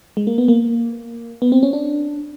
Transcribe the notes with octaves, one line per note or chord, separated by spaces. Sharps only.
G#3
A#3
B3
A#3
B3
C4
C#4
D4